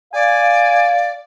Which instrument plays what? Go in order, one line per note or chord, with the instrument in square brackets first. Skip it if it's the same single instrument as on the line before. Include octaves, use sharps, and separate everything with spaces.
[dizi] D5 [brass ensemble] F5 [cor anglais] G#5